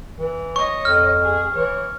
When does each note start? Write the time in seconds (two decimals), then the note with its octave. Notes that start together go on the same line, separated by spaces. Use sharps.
0.18 E3
0.56 C#5 D#5 C#6
0.85 F2 F6
1.22 G#4
1.56 E3 C#5